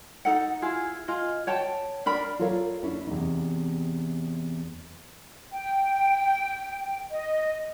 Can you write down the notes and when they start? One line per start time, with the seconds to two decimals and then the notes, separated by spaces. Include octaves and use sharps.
0.25 D#4 A4 F#5
0.62 E4 F4 G#4
1.08 F4 G#4 D#5
1.47 C#5 G5 A5
2.06 D4 A#4 B5
2.39 F4 A4 A#4 C#5 D5 F5
2.83 C#4 D4 E4
3.07 E2 C3 D#4
5.51 G5
7.10 D#5